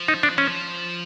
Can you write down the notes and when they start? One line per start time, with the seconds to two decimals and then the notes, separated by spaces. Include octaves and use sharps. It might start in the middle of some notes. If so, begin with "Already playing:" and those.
Already playing: F3
0.08 D#4
0.23 D4
0.38 F3 C#4